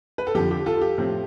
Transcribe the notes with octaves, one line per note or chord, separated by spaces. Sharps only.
B4
A4
F2 D3 F3 G4
G4
F4 A4
G4
A2 F3 C4